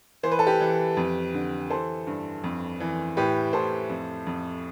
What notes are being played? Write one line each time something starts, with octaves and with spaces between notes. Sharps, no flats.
E3 C5
B4
A4
G4 B4
E3
F2
D3
E3 A4 C5
G2
F2
E3
A2 G4 B4
A2 A4 C5
F2
F2